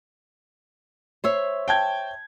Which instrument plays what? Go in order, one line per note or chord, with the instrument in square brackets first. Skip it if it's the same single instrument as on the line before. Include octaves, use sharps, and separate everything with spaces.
[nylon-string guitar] C5 C#5 E5
[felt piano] G5 A5 G#6